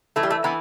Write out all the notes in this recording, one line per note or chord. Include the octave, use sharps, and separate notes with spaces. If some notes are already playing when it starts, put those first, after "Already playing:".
E3 A3
G3
A3
E3 B3